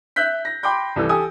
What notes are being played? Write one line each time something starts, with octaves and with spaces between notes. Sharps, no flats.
E5 F#6 G6 B6
A#6
G5 B5 C6 D6 G6
C2 E3 A4
G4 A4 G#5 D#6